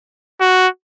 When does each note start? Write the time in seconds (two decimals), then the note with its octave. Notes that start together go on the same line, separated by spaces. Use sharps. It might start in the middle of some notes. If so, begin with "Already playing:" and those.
0.41 F#4